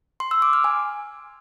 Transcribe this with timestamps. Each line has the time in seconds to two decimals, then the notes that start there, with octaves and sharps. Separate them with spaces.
0.20 C6
0.31 E6
0.42 D6
0.53 F6
0.64 G#5